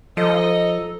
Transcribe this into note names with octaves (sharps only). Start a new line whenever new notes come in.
F3 D#4 A4 D#5